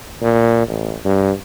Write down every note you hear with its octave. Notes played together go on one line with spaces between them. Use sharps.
A#2
A1
G2